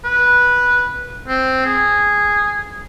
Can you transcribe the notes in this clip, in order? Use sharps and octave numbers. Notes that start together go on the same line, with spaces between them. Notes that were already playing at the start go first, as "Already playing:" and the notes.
B4
C4
G#4